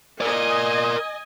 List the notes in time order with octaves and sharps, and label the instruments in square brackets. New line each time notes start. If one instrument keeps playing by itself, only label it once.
[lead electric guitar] A#4 D5 [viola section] D#5 G#5